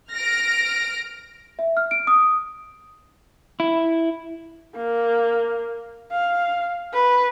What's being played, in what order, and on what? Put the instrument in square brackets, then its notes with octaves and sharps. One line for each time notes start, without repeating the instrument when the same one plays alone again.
[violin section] F6 A#6 D7
[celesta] E5
F6
D7
D#6
[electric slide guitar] E4
[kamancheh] A#3
F5
B4